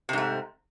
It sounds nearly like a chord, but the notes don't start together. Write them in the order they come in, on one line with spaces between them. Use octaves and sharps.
C3 G#2 A3